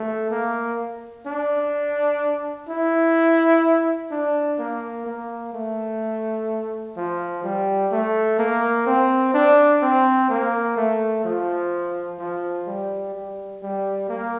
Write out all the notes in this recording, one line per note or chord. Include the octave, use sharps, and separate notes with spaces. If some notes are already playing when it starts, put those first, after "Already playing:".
Already playing: A3
A#3
D4
E4
D4
A#3
A#3
A3
F3
G3
A3
A#3
C4
D4
C4
A#3
A3
F3
F3
G3
G3
G3
A#3